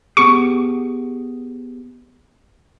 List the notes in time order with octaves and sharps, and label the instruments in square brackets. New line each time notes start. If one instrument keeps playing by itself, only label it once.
[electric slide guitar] B3 G4 G#4 [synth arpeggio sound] C#6